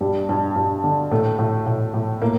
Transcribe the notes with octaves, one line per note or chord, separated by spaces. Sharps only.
G2 G3
G2
G2
D3
A2 A3
A2
A2
A2
A2 A#3